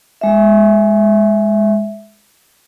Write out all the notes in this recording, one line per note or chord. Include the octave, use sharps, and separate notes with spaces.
G#3 E5